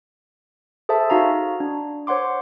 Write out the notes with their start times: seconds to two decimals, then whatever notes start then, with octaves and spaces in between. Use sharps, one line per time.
0.89 G#4 A4 C5 E5 A5
1.10 D#4 F#4 F5 A#5
1.60 D4
2.07 C5 C#5 F#5 C6 D6